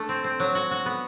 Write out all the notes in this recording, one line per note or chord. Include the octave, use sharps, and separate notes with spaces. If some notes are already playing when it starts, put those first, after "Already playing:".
Already playing: A3 D4
C4
C4
F#3
F#4
F#4
B3